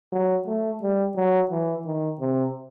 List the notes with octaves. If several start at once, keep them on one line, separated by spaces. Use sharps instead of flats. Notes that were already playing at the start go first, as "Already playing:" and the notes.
F#3
A3
G3
F#3
E3
D#3
C3